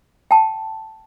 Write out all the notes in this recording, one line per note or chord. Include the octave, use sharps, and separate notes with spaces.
G5 A5